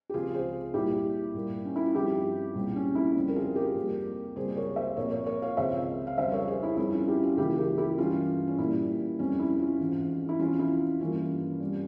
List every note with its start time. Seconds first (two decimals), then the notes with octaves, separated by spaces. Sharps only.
0.10 G4
0.14 C#2 C3 F3 F4 G#4
0.34 G#4 C5
0.74 A#2 G3 A#3 E4 G4
1.34 A#2 G3 A#3
1.65 C#4
1.76 E4
1.86 F4
1.95 G2 F3 C4 E4 G4
2.55 C2 A#2 G#3 C4
2.76 C#4
2.95 E4
3.15 F2 C#3 G3 C4
3.29 A#4
3.36 F4 G#4
3.55 G4 A#4
3.75 F2 C3 G3 A#3
4.36 C#2 C3 G3 A#3 G#4 C5
4.57 A#4 C#5
4.76 C5 E5
4.96 A#2 F3 C4 A#4 C#5
5.11 A#4 C#5
5.26 A#4 C#5
5.42 C#5 F5
5.57 C#2 C3 F3 G#3 C4 C5 E5
6.07 F5
6.17 F2 C#3 G3 C5 E5
6.32 A#4 C#5
6.47 G#4 C5
6.63 E4
6.77 G2 F3 C4 E4
6.92 C#4 F4
7.08 E4 G4
7.23 C#4 F4
7.37 C#2 C#3 E3 A#3 E4 G4
7.58 G4 A#4
7.78 E4 G4
7.98 G2 E3 G#3 C#4 F4
8.47 C#4
8.58 A#2 G3 A#3 E4
9.19 F2 C3 G3 C4 C#4
9.40 E4
9.59 C#4 F4
9.80 G#2 E3 G#3 C4
10.29 E4
10.39 E2 C3 F3 C#4 F4
10.59 E4
11.00 G2 E3 A#3 C#4 F4
11.60 C3 G3